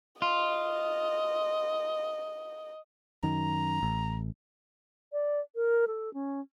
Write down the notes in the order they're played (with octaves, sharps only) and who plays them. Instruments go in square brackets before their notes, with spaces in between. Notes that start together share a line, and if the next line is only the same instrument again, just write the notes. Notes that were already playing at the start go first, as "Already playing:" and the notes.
[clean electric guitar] F4 [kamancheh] D#5
[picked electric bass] F#2 D#3 [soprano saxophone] A#5
[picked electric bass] A1
[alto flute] D5
A#4
A4
C#4